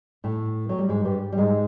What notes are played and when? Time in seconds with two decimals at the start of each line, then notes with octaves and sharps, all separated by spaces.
0.24 A2 A3
0.69 F#3
0.78 G3
0.89 G#2 G#3
1.05 G2 G3
1.32 G3
1.38 G#2 G#3